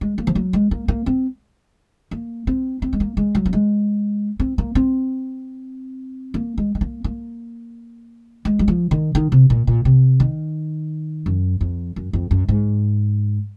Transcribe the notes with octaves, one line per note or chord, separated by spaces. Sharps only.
G#3
A#3
F3
F#3
G#3
A#3
A#3
C4
A#3
C4
C4
G#3
A#3
G#3
F#3
A#3
G#3
C4
A#3
C4
A#3
G#3
G#3
A#3
A#3
G#3
F#3
F3
D#3
D#3
C3
A#2
A#2
C3
D#3
F#2
F2
F#2
F2
F#2
G#2